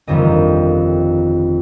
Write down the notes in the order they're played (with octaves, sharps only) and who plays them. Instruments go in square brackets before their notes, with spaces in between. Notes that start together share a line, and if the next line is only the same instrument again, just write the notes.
[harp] G1 F2 D#3 G3 D#5